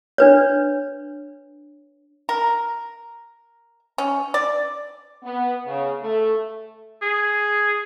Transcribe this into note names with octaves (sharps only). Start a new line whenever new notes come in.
D4 B4 C#5
A#4
C#4
D5
B3
C#3
A3
G#4